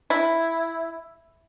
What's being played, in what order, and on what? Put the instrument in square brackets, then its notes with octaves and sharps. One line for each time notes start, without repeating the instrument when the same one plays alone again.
[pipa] E4